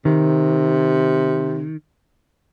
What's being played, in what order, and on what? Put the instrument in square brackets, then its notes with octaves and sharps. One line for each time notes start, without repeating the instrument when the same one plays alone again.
[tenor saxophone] C3 [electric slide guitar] D#3